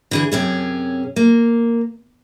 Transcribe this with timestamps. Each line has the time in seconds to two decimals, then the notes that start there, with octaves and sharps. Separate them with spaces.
0.11 D3 E3 G#4
0.32 F#2 C3 C#4 G#4
1.16 A#3